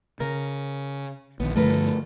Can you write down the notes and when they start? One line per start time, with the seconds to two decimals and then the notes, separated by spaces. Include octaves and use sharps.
0.20 C#3 A#4
1.40 A#1 D#3 B3
1.56 G2 D3 F3 A3 A#4 B4